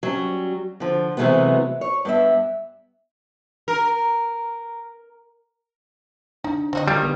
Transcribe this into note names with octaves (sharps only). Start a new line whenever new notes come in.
F#3 G3 C#4
D3 F3
C3 E3 F#3 G#3 A3 B3
C#5
G2 B3 E5
A#4
D4 D#4
D3 C4 F#4 D#5
D#3 G3 F4
D3 B3 B4